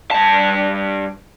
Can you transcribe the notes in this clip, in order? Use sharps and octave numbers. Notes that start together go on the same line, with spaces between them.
G2 A5